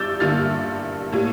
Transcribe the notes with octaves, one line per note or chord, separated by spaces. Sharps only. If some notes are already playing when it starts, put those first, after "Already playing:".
Already playing: G2 G3 D6 E6 F6 G6 A6
G2 D3 G3 A#3 F6 A6
A2 G3 A#3